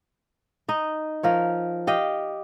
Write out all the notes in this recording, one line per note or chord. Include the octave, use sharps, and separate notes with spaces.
D#4 D#5
F3 A#4 C#5
G4 D#5 F5 G5